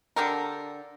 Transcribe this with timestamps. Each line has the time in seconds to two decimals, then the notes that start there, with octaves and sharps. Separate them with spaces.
0.16 D3 G4 A4 A#4